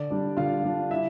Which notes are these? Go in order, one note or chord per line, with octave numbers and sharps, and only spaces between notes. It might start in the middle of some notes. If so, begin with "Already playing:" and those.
Already playing: D3 D5
G3 D4
D3 F4 F5
G3 D4
E4 E5